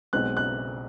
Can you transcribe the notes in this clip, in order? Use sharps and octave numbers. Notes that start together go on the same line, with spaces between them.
B1 B2 G#3 C4 F#6
F#6